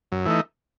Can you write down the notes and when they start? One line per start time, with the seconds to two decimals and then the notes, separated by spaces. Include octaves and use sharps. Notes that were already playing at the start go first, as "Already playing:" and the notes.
0.12 F#2
0.25 E3 A3 D#4